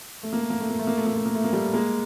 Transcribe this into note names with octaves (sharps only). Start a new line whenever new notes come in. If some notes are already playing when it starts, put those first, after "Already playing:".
A3
A#3
A3
A#3
A3
A#3
A3
A#3
A3
A#3
A3
A#3
A3
A#3
G3 A3
G#3 A#3